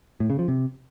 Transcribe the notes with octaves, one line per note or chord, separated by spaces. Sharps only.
A2
C#3
F3
C3